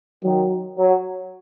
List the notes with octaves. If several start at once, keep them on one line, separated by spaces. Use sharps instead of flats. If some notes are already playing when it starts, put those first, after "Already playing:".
D#3 F#3
F#3